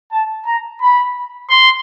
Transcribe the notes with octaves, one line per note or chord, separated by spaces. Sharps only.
A5
A#5
B5
C6